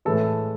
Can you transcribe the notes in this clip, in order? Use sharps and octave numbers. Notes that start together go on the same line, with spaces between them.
A2 E3 G#3 A4